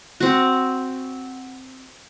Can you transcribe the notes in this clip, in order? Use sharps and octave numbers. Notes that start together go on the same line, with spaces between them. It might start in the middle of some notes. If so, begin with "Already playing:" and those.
C4 F#4